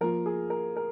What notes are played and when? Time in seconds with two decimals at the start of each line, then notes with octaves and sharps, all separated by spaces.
0.01 F3 A#3 F4 A#4
0.26 G#4
0.50 A#4
0.76 A#4